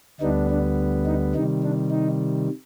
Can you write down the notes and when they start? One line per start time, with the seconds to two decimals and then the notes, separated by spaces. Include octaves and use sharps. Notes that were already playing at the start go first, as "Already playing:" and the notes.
0.20 D2 D3 G3 B3 D4 D#4
0.50 D4
1.06 D#4
1.35 C3 D#3 G3 D#4
1.63 D4
1.91 D#4